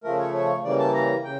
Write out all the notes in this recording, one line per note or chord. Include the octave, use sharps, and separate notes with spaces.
C#3 F3 A3 A#4
C#5
C#5
C#3 E3 G3 A#3 D5
A5
A#5
C#3 G5